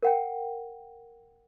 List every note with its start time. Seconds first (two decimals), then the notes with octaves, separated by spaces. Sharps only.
0.03 A#4 F#5 G5